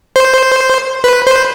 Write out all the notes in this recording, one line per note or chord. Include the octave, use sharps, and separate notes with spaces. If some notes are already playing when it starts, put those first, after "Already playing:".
C5
B4
C5